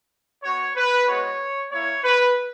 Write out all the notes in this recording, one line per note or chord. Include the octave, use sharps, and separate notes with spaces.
B3 F#4 C#5
B4
G#3 B3 F#4 C#5
A#3 E4 C#5
B4